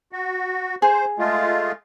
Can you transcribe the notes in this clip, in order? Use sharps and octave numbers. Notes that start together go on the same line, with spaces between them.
F#4
G#4 C5
G#3 A3 F4